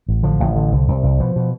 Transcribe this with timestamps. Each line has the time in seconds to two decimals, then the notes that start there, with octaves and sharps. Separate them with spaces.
0.09 A1
0.23 D3 F3
0.40 A1
0.56 D3
0.72 C2
0.88 C2
1.03 C2
1.20 B2 F3
1.36 B2